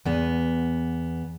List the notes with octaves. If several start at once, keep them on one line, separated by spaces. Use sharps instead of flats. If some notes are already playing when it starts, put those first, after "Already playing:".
E2 B3